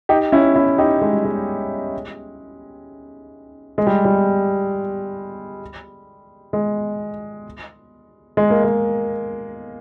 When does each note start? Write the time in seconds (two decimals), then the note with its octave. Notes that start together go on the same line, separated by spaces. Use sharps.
0.09 D#4 G4
0.32 C#4 E4
0.56 C#4 E4
0.78 D#4 G4
1.01 G#3
1.13 G3
1.25 G#3
3.78 G#3
3.87 G3
4.05 G3
6.53 G#3
8.37 G#3
8.50 A#3
8.64 G#3